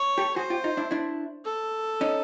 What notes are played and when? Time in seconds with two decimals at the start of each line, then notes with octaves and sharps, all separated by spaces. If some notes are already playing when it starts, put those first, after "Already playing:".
Already playing: C#5
0.18 G4 A4
0.36 F#4 G#4 C5
0.50 F4 G4
0.64 D#4 F4
0.77 D4 E4
0.91 D4 E4
1.45 A4
2.01 C#4 D#4